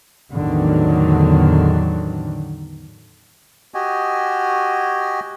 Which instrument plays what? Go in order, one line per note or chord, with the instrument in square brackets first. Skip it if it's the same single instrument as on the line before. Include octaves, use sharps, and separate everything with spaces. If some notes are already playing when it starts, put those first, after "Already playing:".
[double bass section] A1 E2 D3 D#3 F#3
[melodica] F#4 G4 D#5 G#5